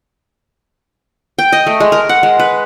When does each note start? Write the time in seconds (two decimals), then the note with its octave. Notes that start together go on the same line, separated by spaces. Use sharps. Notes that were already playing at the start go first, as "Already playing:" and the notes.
1.39 G5
1.53 D#5
1.67 A3
1.80 G#3
1.92 A#4
2.09 F#5
2.23 G#3
2.39 B4